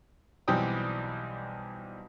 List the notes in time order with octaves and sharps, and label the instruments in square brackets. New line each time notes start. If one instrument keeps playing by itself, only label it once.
[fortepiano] B1 E3 G3 C4 G5 D#6